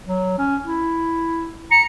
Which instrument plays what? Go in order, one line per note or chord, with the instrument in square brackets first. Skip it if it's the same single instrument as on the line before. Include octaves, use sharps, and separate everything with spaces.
[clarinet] F#3
C#4
E4
[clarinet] A#5 [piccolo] C#7